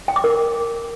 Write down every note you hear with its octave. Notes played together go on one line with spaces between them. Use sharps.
G5
D6
A#4